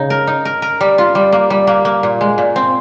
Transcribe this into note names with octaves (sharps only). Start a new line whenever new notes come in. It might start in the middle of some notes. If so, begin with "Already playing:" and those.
Already playing: C#3 D#4
A#4
D#4
A#4
A#4
G3
F4
G3
A#3
G3
A#3
A#3
A#2
G#3
A#2
C4